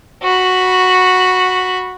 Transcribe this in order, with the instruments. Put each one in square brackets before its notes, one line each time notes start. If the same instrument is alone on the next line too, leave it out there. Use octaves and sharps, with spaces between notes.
[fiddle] F#4 B5